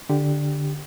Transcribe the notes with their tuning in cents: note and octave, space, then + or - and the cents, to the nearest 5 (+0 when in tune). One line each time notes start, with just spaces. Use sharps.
D3 +0 G4 +0